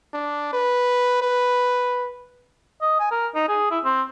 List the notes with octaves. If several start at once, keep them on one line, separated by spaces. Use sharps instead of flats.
D4
B4
B4
D#5
G#5
A#4
D#4
G#4
E4
C4